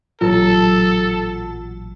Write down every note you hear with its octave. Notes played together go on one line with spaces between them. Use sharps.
A1 A#2 F#3 F4 A4 A5 E6